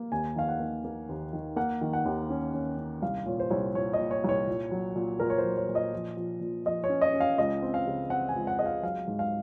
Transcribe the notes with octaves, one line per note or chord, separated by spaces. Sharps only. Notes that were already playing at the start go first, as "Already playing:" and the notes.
Already playing: A#3
D#2 G#5
D#3 F5
F#5
A#3
A#3
D#2
D#3
A#3 F#5
D#3
F#5
D#2
C#4
C#4
C#4
C2 F5
A#2 C#5
C5
C2 C#5
A#2 C#5
D#5
A#2
C#5
C2 C#5
A#2
F#3
A#2
A#2 A#4
C#5
C5
F#3
C#5
A#2
D#5
F3
F3
A#2
F3 D#5
C#5
C#4
D#5
C#4
F5
C#2 D#5
C4
F5
C#3
C4 F#5
G#5
C#2
F#5
G#3 D#5
F5
F#3 F5
G#2
F5